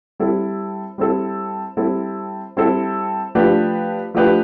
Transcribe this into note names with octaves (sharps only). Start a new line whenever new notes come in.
G3 C4 E4 A4
G3 C4 E4 A4
G3 C4 E4 A4
G3 C4 E4 A4
F3 A3 D4 G4 B4
F3 A3 D4 G4 B4